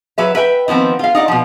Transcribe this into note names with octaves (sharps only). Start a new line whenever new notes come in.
F#3 B4 E5
B4 E5 G5
D#3 F3 B3 C4
F4 F5
D#4 D5 F#5
B2 F3